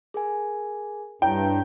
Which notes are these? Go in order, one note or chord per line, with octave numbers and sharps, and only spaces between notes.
G#4 A#4 G#5
G2 E4 C#5 G5 A#5